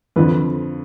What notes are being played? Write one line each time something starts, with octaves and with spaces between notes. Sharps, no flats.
F2 D3 F3 B4